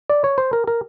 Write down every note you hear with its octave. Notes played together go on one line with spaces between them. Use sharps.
D5
C#5
C5
A#4
A#4